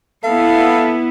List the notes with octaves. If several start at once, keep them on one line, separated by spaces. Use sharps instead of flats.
B3 E4 A4 F5